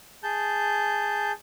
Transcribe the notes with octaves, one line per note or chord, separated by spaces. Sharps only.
G#4 A5 G6